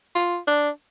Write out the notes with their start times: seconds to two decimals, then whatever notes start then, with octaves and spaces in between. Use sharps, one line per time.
0.15 F4
0.47 D4